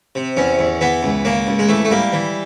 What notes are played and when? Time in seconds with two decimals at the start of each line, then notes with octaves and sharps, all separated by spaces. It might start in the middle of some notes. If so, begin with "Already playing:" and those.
0.15 C3
0.37 E2 C#4
0.59 E2
0.81 E3 B3
1.03 C#2
1.25 C#3 A#3
1.47 C#2
1.59 G#3
1.69 E3 A3
1.85 A3
1.91 G3 A#3
2.13 E3